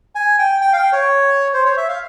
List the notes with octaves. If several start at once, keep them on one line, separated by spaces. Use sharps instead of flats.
G#5
G5
G5
F5
G5
C#5
C5
C#5
E5
F5